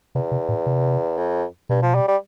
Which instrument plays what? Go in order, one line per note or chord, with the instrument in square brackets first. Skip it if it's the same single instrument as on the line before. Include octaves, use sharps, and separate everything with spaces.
[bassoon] E2 [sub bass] C3
[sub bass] C3
A2
C3
[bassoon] F2
[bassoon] G2 [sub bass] B2
[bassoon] F3
G3
G3